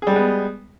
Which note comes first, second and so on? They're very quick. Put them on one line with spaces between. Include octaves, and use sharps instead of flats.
G#4 G3 G#3 B3